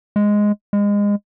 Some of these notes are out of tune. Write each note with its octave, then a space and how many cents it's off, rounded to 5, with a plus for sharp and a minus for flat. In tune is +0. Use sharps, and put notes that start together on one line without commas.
G#3 +0
G#3 -25